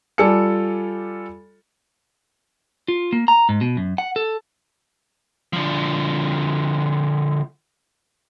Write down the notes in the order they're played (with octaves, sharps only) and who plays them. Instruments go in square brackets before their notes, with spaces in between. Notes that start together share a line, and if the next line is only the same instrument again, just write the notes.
[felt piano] G3 F4 A4 D5 G#5 C#7
[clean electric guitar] F4
A#3
A#5
G#2
B2
F#2
F#5
A4
[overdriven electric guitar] D3 F3